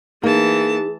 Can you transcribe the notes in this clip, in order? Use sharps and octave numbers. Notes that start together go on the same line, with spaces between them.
E3 A#3 D#4 G#4 A5